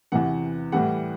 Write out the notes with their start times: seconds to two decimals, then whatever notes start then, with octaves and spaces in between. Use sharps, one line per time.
0.12 E2 C3 E3 F#5
0.72 A2 E3 G3 F#5